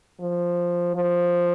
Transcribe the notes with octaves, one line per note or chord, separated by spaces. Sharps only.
F3
F3